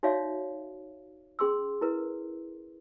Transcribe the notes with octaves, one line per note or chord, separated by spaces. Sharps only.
D#4 F#4 C#5 D5 E5 F5
C#4 G#4 C6 D6 E6
E4 A#4 B4